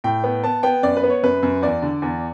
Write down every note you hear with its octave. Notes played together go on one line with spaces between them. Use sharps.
A2 G5
B3
B3 A5
B3 G5
F#2 D5
B4
B3
C#5
F#2 B4
F#2
E2 D5
D3
E2